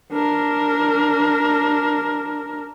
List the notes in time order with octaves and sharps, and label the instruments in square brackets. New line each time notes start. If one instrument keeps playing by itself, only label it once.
[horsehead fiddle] D4 A#4